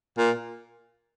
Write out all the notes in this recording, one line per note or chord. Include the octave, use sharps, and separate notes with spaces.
A#2